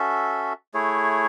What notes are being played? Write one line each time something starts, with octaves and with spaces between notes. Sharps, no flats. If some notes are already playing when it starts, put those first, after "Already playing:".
Already playing: C#4 F#4 A4 E5
A3 E4 G#4 C#5